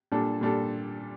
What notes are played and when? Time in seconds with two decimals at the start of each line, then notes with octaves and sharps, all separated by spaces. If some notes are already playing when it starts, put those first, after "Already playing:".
0.12 A#2 G3 D4 A4
0.41 A#2 G3 D4 A4